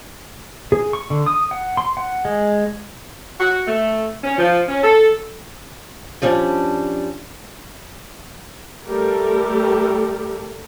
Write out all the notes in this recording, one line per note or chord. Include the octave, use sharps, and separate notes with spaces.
G#4
C#6
D3
D#6
F#5
C6
F#5
G#3
F#4
A3
C#4
F3
C#4
A4
F3 G3 C#4 D4
G3 A3 G4 A4 A#4